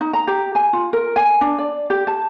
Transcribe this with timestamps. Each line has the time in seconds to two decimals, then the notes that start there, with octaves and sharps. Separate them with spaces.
0.01 D#4
0.13 A#5
0.27 G4
0.55 G#5
0.73 F4
0.93 A#4
1.16 G#5
1.41 D4
1.58 D5
1.90 G4
2.07 A5